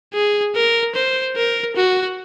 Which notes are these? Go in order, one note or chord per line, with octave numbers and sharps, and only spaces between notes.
G#4
A#4
C5
A#4
F#4